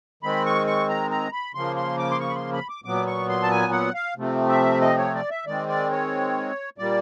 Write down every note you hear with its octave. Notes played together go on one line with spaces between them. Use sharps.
D#3 G#3 C4 B5
C#6
C#6
A#5
A#5
B5
C#3 F3 A#3 C6
C6
D6
C6
C#6
B5
C6
B5
D6
A#2 F#3 B3 D6
C#6
C6
A5
G#5
F#5
F5
C3 F3 A3 C4
E5
D#5
C#5
D5
E5
D#3 G#3 C4 D5
D5
C#5
A#2 G3 A#3 D5